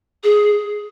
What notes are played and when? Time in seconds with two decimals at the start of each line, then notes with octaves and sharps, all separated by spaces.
0.24 G#4